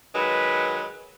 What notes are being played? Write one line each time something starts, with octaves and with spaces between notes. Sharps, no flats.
D#3 F#3 G#3 B4